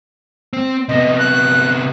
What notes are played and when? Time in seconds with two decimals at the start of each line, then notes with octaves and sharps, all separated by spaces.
0.53 C4
0.89 C3 B3 D#5
1.19 F#6